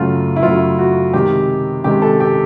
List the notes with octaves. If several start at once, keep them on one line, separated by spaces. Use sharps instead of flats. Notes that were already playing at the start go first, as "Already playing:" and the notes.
Already playing: F#2 C#3 F#3 A3 F4
E4
F#2 C#3 F#3 A3 F4
F#4
C3 D#3 G#3 G4
C3 D#3 G#3 G4
A4
G4